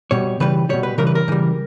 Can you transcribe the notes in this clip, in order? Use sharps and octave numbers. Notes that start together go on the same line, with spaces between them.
B2 G3 C#5
C#3 E3 G3 B4
B2 G3 C#5
B4
C#3 E3 G3 A#4
B4
A#4
C#3 E3 G3